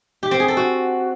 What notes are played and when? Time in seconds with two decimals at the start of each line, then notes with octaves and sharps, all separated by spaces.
0.23 G4
0.31 C4
0.40 G#4
0.48 A4
0.57 F#4